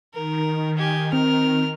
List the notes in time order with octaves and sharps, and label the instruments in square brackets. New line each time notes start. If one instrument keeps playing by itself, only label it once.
[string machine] D#3 [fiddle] A#4
[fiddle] G4 G#5
[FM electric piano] C4 [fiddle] A#4 F6